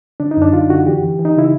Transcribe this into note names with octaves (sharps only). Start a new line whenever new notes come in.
D3 D4
D#4
F#2 D4
D3 F4
D3 F#4
E3 G4
E3
E3
D#4
C#3 E4